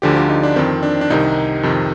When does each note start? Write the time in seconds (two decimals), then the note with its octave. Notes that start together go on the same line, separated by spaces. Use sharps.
0.02 D2 D3 F3 G4
0.16 F4
0.29 D#4
0.43 D4
0.56 F2 D#3 C4
0.83 D4
1.01 D4
1.10 C2 C3 D#3 D#4
1.63 F2 C3 D#3